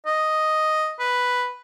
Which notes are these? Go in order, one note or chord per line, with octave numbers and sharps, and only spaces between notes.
D#5
B4